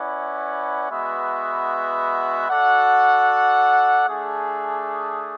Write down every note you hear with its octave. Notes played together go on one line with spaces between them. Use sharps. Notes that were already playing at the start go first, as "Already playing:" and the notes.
Already playing: C#4 E4 B4 D5 F#5
G#3 B3 F#4 B4 E5
F#4 A4 D5 F#5
A3 D4 G#4